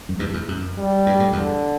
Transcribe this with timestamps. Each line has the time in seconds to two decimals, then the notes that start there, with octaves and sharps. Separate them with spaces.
0.09 F#2
0.19 E2 G2
0.34 E2
0.48 F#2
0.78 G3
1.06 G2
1.20 A2
1.33 E2 G2 D3